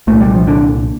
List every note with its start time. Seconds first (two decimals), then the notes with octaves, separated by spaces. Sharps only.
0.07 C2 A#2 A3
0.20 G3
0.34 F3
0.47 D3